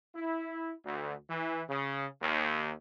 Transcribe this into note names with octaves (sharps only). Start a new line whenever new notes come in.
E4
D2
E3
C#3
D#2